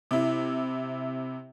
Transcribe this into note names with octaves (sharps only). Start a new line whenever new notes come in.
C3 E4